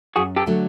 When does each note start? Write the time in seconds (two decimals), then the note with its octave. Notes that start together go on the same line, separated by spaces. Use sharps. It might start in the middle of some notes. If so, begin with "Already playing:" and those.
0.16 F#2 F#4 G#4
0.36 G4 A4
0.46 D3 F#3 A3 D4